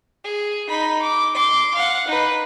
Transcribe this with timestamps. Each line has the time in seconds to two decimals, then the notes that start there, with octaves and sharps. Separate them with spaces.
0.24 G#4
0.68 D#4 B5
1.02 D6
1.35 C6 D6
1.75 F5 F#5
2.08 D#4 B4